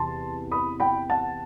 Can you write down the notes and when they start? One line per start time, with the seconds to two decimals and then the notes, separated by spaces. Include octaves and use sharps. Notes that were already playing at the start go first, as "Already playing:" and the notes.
Already playing: E2 C3 E3 A5 C6
0.51 B5 D#6
0.80 G5 B5
1.10 F#5 A5